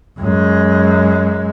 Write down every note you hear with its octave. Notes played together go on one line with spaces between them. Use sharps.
F#2 G#3